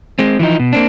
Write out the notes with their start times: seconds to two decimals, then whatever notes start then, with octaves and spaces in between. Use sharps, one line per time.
0.19 G#3 C4
0.39 E3 F3 D#4
0.59 B2
0.73 A#3 C4 D4